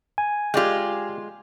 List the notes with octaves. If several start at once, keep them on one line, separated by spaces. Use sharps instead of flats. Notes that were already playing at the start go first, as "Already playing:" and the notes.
G#5
G#3 F4 G4 D5 G5